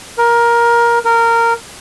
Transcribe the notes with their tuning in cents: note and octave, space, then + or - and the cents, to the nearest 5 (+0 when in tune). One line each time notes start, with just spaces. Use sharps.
A#4 +15
A#4 -15